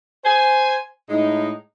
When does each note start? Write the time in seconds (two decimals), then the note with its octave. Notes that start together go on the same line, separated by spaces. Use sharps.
0.24 C5 G#5
1.09 A2 G#3 D#4